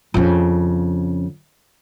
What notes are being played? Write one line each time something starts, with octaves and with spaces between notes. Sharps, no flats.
F2 C#3